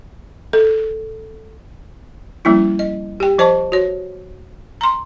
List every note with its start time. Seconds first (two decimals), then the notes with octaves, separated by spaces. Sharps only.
0.53 A4
2.45 F3 G3 A#3 C#4 E4
2.79 D#5
3.20 G4 G5
3.38 F3 C5 D#5 A5 C#6
3.72 F#4 C#5
4.81 A#5 C6